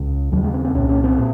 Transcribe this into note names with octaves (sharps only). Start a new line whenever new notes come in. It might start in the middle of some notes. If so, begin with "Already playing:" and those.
Already playing: C#2 C#3
D#2 C#3 F#3
G#3
C4
C4
C2 A#2 C#4
C#4
C4
A#2